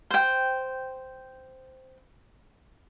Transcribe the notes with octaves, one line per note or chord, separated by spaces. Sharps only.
C5 G5